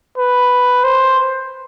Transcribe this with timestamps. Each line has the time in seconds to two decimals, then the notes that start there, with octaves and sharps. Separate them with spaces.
0.18 B4
0.84 C5